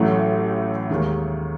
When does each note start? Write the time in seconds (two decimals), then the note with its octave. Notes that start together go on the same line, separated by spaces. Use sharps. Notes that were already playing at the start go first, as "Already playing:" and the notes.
Already playing: A1 A2 F#3 A3
0.90 D#2 D#3 G#3